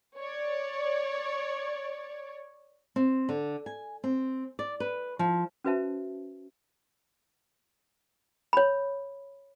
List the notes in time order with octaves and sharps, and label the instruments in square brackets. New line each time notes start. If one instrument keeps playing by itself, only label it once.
[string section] C#5 D5
[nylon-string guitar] C4
D3
G#5
C4
D5
B4
F3
[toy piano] C#4 F#4 B4 C5 E5 A5
C#5 B5